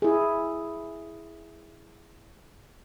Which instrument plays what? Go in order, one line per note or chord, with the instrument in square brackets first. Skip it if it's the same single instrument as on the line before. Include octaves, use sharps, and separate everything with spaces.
[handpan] E4 G#4